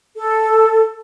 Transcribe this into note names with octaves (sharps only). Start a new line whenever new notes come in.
A4